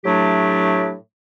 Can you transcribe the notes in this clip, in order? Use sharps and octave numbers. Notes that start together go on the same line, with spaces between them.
A2 F#3 A3 D4 G4